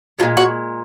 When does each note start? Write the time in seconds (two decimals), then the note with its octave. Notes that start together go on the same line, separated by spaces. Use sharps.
0.19 A#2 F3 G#3 F4
0.37 F#4